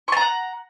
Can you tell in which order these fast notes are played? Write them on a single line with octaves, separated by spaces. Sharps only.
C#6 A5 A#5 F#5